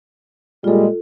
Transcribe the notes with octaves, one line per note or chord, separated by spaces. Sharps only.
A#2 G3 G#3 F4 A4